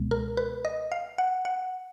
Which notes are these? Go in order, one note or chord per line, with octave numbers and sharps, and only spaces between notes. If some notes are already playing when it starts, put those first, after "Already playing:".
Already playing: C#2 B2 G#3 B3
A#4
B4
D#5
F5
F#5
F#5